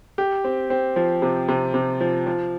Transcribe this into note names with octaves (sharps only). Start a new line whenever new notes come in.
G4
C4
C4
F3
C3
C3
C3
F3
F3